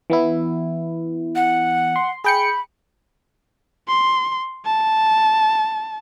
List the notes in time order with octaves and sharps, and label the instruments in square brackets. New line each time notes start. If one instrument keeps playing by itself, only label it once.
[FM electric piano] E3 B3 E4
[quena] F#5
[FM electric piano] C6
[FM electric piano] G#4 G5 C#7 [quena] B5
[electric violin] C6
A5